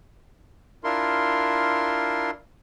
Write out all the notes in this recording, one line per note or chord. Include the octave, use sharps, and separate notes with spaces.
D4 E4 F4 A#4 C6